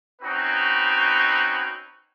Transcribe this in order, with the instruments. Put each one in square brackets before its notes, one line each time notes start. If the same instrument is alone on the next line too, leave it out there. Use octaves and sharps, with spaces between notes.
[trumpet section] C4 C#4 D#4 F#4 B4